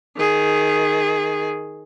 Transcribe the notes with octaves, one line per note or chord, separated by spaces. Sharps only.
D#3 G#4